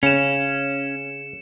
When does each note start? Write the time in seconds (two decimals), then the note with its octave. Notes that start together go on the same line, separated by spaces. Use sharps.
0.03 C#3 C#4 C#7 E7